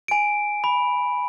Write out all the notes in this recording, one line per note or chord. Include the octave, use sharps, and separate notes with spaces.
G#5 D7
B5